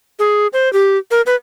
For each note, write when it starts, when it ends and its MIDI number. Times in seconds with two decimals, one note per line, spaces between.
0.19 0.47 68
0.53 0.71 72
0.73 0.98 67
1.11 1.21 70
1.26 1.35 71